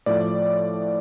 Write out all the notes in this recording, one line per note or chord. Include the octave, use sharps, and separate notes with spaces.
A2 F3 A3 D5